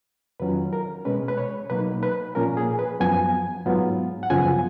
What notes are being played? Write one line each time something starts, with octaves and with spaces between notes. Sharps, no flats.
F2 D#3 F#3 C#4 F4 B4
A#4
B2 G#3 C#4 B4
B4
C#5
B2 F#3 A#3 D#4 B4
B4
A#2 F3 A#3 C#4 F4 A#4
G#4
B4
F#2 F3 B3 G#5
G#2 F#3 B3 F4
F#5
F#2 C#3 F3 B3 F4 G#5